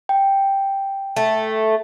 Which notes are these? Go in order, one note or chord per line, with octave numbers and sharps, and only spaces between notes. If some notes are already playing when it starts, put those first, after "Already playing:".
G5
A3